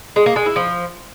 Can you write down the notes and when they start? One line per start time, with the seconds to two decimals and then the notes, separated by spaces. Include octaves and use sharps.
0.16 G#3
0.26 A#3
0.36 G#3
0.46 E4
0.56 F3